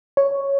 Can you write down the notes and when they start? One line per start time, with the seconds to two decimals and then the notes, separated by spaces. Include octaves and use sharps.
0.17 C#5